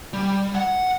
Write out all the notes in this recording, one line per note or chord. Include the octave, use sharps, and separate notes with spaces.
G3
F#5